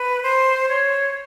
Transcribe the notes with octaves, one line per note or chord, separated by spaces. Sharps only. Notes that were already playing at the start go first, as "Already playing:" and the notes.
Already playing: B4
C5
C#5